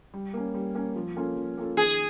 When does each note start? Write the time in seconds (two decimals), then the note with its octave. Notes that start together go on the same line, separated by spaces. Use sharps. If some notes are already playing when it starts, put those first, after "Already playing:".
0.14 G3
0.33 A#3 C#4
0.54 G3
0.75 A#3 C#4
0.96 F3
1.16 A#3 C#4 F4 A4
1.36 F3
1.57 A#3 C#4 F4 A4
1.77 D#3 G#4